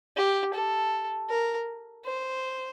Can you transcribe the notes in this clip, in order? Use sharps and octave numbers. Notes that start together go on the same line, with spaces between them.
G4
A4
A#4
C5